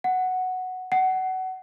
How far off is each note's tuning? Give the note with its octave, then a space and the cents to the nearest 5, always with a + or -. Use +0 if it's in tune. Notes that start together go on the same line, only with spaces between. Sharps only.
F#5 +0
F#5 +25